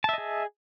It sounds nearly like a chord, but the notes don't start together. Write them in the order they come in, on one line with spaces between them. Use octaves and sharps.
A5 E5 D#5 G#4